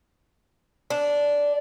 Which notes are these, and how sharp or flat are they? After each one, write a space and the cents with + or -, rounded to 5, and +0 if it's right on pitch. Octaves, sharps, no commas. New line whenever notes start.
D4 -10